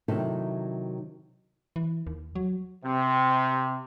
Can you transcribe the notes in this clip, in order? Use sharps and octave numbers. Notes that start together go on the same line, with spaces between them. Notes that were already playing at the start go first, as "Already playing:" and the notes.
C3 D#3 F#3 D#4 E4 A4
E3
D#2
F#3
C3